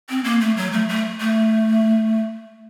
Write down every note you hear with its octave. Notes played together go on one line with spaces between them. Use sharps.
C4
A#3
A3
F#3
A3
A3
A3